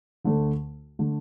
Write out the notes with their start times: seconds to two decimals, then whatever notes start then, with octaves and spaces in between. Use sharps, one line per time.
0.24 D2 D3 A3 D4 A4
0.99 D3 A3